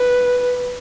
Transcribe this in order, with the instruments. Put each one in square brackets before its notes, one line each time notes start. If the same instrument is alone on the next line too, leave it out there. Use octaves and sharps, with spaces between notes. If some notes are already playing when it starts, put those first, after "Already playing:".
Already playing: [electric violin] B4